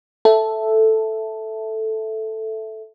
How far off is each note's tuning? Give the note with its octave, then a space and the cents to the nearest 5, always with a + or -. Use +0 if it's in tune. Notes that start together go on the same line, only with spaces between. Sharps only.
A4 +0 E5 +0